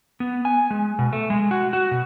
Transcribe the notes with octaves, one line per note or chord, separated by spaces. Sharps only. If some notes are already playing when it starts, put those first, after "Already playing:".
B3
G#5
G#3
B2
A3
G#3
F#4
F#4
B2